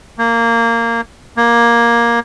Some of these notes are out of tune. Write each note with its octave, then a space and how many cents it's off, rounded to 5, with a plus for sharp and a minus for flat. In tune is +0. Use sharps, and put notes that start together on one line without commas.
A#3 -15
A#3 +10